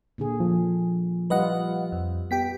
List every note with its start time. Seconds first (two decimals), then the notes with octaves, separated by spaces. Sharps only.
0.18 A#2 D3 G#4
0.40 F3
1.30 G3 F4 B4 D#5 F#5
1.92 F2
2.31 B3 G4 G5 B6